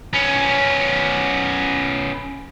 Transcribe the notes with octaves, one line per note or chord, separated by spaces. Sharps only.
B3 C#4